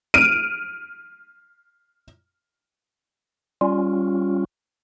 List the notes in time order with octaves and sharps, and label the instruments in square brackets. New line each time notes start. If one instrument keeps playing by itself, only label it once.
[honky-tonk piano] F6 D7 D#7
[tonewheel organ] G3 C#4 F4